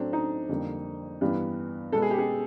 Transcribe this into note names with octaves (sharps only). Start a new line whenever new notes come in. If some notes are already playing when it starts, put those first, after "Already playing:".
Already playing: A2 F#3 A3 C4 D4
D#4
F2 D3 G3 A#3
G2 E3 G3 B3
B2 G#3 B3 A4
G#4
G4
G#4